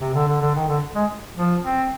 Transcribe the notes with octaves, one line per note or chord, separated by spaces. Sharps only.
C3
D3
D3
D3
D#3
D3
G#3
F3
C4